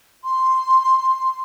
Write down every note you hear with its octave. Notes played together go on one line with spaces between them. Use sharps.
C6